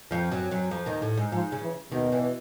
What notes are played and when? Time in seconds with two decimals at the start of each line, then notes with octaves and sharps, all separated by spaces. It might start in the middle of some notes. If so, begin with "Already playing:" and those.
0.11 F2 F3
0.31 F#2 F#3
0.51 F#2 F#3
0.71 F2 F3
0.86 D#2 D#3
1.02 A2
1.17 G#2
1.32 G#2 F3
1.52 C#3
1.62 E3
1.92 D#2 B2 D#3
2.12 E2 E3